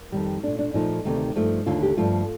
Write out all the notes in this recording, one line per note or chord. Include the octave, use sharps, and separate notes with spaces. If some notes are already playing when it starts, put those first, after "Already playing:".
Already playing: A#3
F2 D#3 G3
A#2 A3 D4
D4
A#2 F3 A3 D#4
D2 C3 D#3 A3
G2 F3 A3
D#2 D3 A3 F4
G4
G2 F3 A3 F4